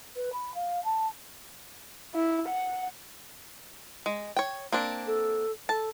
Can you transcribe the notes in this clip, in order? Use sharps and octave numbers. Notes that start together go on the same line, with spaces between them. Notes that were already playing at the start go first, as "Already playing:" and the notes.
B4
B5
F5
A5
E4
F#5
G#3
C#5 G5
A#3 C4 D4
A4
A4 A5